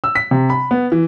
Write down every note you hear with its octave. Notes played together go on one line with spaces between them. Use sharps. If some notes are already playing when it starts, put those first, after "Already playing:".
E6
B6
C3
B5
B3
E3